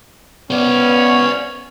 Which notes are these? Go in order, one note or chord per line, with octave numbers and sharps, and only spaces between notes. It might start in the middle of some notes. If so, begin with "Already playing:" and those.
B3 C#4 C5 D5